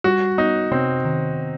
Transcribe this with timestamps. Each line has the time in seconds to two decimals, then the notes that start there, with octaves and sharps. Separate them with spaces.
0.04 G3 F#4
0.38 B3 D#4
0.71 C3 C4
1.05 D#3